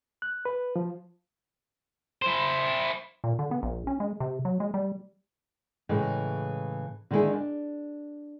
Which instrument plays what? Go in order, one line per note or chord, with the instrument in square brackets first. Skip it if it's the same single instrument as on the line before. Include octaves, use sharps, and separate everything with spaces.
[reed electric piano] F#6
B4
F3
[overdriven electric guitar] E4 C5
[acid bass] A#2
D3
B3
A#1
C#4
G#3
C3
F#3
G#3
G3
[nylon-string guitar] A2 C#3 E3 G#3
D3 D#3 G#3 C4 E4 G#4
D4